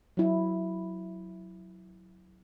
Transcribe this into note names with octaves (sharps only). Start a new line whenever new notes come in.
F#3 E4